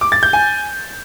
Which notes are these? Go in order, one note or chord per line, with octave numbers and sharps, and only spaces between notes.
D6
A6
G6
G#5